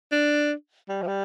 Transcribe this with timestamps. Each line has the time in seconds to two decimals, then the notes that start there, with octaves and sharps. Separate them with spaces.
0.12 D4
0.89 G3
1.03 F3
1.07 G3